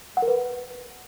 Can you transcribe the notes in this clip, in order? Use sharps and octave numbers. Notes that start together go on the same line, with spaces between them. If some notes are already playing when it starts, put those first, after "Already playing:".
F#5
A#4
B4